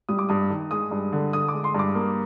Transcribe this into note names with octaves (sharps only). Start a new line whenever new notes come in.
G3 D#6
D6
G2 D#6
D#3
G#3 D#6
G2
D3
D3 D#6
G#3 D6
C6
G2 D6
A#3